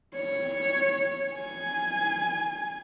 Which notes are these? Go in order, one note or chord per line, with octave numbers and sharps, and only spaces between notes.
C#5
G#5